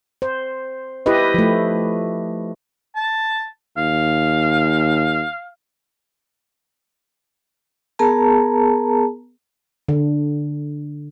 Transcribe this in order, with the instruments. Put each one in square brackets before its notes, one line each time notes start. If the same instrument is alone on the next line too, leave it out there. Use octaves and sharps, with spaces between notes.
[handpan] C5
E4 G4 B4 D#5
F3 A3
[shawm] A5
[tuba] D#2 [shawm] F5
[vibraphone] B3 G#4 A#4 A5 A#5
[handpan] D3